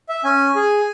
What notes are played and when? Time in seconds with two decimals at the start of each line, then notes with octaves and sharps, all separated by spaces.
0.09 E5
0.24 C#4 G#5
0.56 G#4